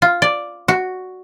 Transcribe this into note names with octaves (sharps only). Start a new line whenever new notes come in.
F4
D5
F#4